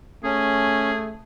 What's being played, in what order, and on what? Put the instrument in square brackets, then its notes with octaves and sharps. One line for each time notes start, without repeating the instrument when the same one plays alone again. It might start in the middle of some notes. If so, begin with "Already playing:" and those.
[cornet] A3 [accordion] C#4 [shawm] G#4